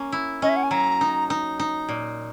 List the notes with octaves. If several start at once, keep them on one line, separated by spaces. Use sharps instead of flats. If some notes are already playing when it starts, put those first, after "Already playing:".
Already playing: A#3 C#4
E4
C#4 D#5
E5
F#5
G#5
F#3 A#5
D#4
D#4
D#4
A#2